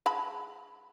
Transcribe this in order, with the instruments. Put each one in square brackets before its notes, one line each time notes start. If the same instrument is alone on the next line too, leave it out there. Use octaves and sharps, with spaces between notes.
[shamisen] G#3 A5 B5